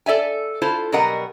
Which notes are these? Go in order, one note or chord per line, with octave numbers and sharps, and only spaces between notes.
A4 D5 E5 G#5
E4 F4 A4 C5
B2 F#3 G3 A#4 D#5 F#5